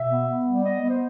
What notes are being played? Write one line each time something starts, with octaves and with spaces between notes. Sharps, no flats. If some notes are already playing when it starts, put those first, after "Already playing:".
Already playing: B2 E5
B3
B3
G3
B3 D#5
B3
C5